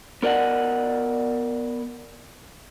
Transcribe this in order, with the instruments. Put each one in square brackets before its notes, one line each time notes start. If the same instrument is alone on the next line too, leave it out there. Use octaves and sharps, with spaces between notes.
[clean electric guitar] B3 A#4 D5 D#5 F#5